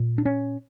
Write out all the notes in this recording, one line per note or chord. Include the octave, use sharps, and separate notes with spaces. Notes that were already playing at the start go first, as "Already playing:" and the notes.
Already playing: A#2
D4
C#4